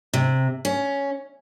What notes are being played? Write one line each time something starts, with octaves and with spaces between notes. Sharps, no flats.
C3
C#4